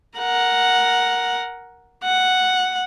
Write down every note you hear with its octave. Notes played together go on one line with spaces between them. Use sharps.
A#4 F#5
F#5